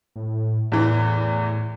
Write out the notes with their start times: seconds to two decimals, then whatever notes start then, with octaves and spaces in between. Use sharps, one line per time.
0.16 A2
0.72 E2 A2 E3